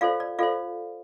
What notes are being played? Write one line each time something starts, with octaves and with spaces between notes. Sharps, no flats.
F4 A4 C5 D5 F5
D5
F4 A4 C5 D5 F5